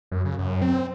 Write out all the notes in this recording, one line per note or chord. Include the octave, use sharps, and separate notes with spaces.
F#2
C#3
F#2
C4